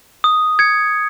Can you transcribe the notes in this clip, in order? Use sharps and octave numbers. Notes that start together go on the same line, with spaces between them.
D#6
G#6 C#7